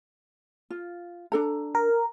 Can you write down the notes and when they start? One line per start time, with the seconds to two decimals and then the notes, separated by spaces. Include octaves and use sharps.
0.70 F4
1.32 D4 A4 A#5
1.75 A#4